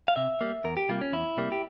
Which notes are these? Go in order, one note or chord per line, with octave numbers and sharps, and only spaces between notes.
F5
C3 E5
G3 A#3
E2 A#4
G4
C3 G3 A#3 F4
C#4
E2 E4
C3 G3 A#3
G4